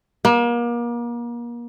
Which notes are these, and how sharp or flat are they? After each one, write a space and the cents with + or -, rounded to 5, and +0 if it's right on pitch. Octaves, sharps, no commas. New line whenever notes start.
A#3 +35